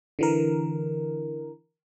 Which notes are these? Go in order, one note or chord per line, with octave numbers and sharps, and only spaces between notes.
D3 E3 A#4